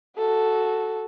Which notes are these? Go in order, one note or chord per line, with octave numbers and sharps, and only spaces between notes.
F#4 A4